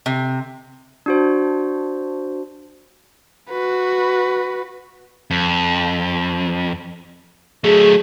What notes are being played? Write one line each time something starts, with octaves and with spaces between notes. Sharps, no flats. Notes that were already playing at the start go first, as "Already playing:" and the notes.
C3
D4 F#4 C5
F#4 B4
F2
F#3 A3 G#4